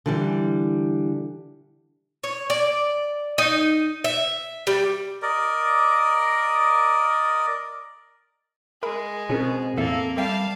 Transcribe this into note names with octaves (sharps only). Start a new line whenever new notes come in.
D3 E3 G3
C#5
D5
D#4
E5
G3
A#4 D5 D#5
G#3 A#4 E5 B5
B2 C4 C#4 G#4 A#4
E2 A2 A#3 A4 E5
G3 E5 F5 G5 A5 C7